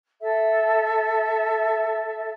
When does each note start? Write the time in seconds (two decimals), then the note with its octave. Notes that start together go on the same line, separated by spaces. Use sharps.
0.20 A4 E5